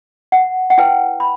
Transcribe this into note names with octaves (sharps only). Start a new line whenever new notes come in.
F#5
F#5
E4 B4 G5
B5